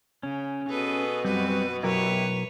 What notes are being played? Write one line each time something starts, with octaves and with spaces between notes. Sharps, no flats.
C#3 C#4
B2 G#4 A4 B4
F#2 G3 C4 F#4 B4
B1 F#3 E4 G4 A#4 B4 C#5